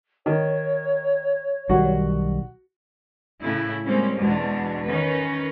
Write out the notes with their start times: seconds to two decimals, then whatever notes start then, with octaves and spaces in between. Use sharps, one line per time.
0.26 D#3 C#5
1.69 B1 D#3 G3 F#4
3.42 A2 C#3 E4
3.85 G3 G#3 A#3 C4 C#4
4.18 E2 B2 G#3 D4
4.86 D#3 C#4 D#4 B4